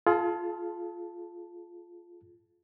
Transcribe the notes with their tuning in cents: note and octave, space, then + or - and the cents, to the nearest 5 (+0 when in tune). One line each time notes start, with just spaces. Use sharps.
F4 -5 G#4 +40 A5 +0